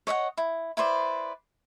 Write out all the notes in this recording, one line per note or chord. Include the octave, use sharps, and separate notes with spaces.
C#5 D#5 E5 F#5
E4
E4 B4 C5 D5